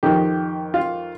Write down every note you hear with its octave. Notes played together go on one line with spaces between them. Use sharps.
F2 D#3 G4
F4